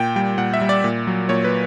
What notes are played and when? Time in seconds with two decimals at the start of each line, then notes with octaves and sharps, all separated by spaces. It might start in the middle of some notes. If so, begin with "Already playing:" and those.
Already playing: A#2 G5
0.16 G3 G5
0.38 A#2 F#5
0.54 E5
0.61 G3
0.69 D5
0.84 A#2
1.07 F#3
1.29 A#2 C#5
1.45 B4